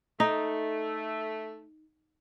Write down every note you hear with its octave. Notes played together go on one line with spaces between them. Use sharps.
A3 D#4